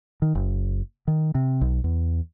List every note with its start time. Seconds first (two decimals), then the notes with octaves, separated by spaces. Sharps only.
0.22 D#3
0.35 F#1
1.08 D#3
1.35 C3
1.61 B1
1.84 E2